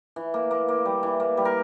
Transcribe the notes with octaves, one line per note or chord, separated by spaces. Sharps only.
E3
A#3
A#3
A#3
G3
E3
A#3
G3
A#4